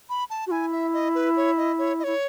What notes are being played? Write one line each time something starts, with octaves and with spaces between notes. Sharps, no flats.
B5
A5
F#4
E4 G#5
E5
D#5
B4
C#5
D#5
C#5
D#5
E4 C#5